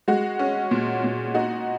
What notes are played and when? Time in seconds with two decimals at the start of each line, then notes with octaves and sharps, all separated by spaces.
0.08 G#3 F#4
0.39 C#4
0.71 A#2
1.04 A#2
1.35 D#4 F#4